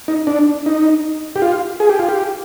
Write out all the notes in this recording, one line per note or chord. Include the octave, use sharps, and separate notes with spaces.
D#4
D4
D#4
G4
F4
G#4
G4
F4
G4